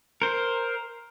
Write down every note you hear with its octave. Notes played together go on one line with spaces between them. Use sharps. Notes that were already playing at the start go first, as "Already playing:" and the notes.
A#4 C5